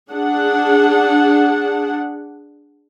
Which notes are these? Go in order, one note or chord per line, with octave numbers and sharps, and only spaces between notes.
D4 G#4 F#5